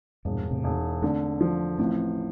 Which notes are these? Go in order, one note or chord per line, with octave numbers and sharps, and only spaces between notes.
E1 G2 A#2
A2 C3
E1
D3 A3 C4
F3
A1 A3 C4